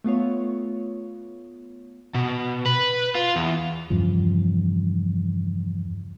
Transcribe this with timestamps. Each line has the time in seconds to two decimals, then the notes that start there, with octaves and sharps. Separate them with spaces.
0.04 A3 B3 F4 C#5
2.14 B2
2.66 B4
3.15 F4
3.36 E2
3.90 E2 G2 C#3 F3